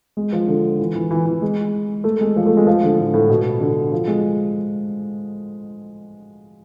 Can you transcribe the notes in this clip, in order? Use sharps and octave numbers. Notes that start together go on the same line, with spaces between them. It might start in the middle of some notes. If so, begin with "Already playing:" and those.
G#3
F3
D3
E3
E3
E3
E3
G#3
A3
G#3
F3
A3
G#3
F3
D3
A2
A2
B2
D3
F3
G#3